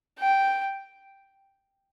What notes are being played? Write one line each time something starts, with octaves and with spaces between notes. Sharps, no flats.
G5